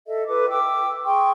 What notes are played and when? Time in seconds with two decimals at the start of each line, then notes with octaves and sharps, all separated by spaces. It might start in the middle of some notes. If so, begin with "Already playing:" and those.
0.07 A4 D#5 E5
0.27 F4 A4 B4 D6
0.49 E5 G5 D6 E6
1.04 G#4 G5 C6 C#6